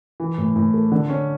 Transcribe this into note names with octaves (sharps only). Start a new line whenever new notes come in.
E3
A2
A2
A3
D3
C#4